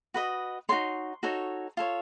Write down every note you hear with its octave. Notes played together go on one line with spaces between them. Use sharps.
F#4 B4 D#5
D#4 F#4 A4 C#5 C6
D#4 F#4 A4 C#5
F4 A4 C#5